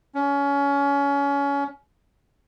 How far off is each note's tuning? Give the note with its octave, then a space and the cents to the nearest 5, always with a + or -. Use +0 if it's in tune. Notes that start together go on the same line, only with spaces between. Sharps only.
C#4 +25